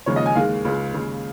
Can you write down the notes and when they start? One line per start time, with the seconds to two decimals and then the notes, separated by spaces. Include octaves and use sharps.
0.06 D#2 C#3 F3 G#3 C#5
0.16 D#5
0.26 G#5
0.35 D#2 D#3 G#3 F5
0.65 C#2 C#3 G#3
0.93 D#2 C#3 G#3